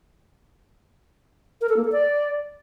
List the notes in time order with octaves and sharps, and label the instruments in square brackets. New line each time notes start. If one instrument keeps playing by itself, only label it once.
[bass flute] A#4
A4
A#3
A4
D5